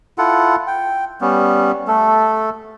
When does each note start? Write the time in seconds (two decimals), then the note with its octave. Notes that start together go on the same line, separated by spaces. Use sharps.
0.18 E4 F4 A4 F#5
0.67 G5
1.21 G3 B3 C#4
1.87 A3 A4